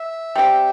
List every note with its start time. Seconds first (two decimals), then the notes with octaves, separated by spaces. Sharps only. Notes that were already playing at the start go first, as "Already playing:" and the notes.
Already playing: E5
0.36 G3 C4 G4